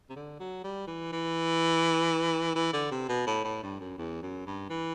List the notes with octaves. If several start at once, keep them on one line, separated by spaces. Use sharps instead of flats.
C3
D3
F#3
G3
E3
E3
E3
D3
C3
B2
A2
A2
G2
F#2
E2
F#2
G2
E3